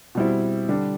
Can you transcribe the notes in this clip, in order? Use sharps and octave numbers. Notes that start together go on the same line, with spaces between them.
B2 G3 C4 E4
D3 G3 D4